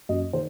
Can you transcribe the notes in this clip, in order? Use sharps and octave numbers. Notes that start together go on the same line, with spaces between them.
F#2 D#5
D#3 C5